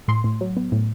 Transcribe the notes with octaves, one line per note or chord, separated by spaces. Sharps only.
A2 C6
A2
F#3
B3
A2